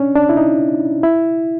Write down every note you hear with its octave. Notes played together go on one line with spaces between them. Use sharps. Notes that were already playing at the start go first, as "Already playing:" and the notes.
Already playing: C#4 D4
D4
E4
D#4
E4